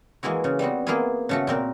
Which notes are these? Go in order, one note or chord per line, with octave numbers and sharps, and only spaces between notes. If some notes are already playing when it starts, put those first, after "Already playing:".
E3 G#3 A#3 E4 F#4
C#3
G3 B3 C4 F#4
A#3 B3 E4 F4 G#4
C#3 A3 F#4
A#2 C4 A#4